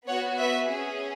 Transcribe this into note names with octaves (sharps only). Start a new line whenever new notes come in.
B3 F#4 C#5 F#5
B4 E5
C#4 G#4